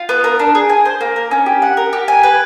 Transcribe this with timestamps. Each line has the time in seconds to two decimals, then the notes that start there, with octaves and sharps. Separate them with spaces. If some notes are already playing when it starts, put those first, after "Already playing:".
Already playing: F4
0.09 B3
0.24 A#4
0.39 D4
0.55 G#4
0.69 G#5
0.85 C5
1.01 A#3
1.16 A#4
1.31 C#4
1.46 G4
1.62 F#5
1.77 A#4
1.93 G4
2.08 G#5
2.23 B4